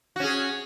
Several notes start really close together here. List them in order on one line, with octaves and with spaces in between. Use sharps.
F#4 C#4 G#4